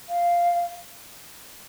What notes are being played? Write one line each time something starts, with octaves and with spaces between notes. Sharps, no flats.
F5